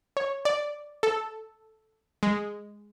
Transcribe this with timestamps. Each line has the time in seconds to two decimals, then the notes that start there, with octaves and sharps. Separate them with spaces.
0.17 C#5
0.45 D5
1.03 A4
2.23 G#3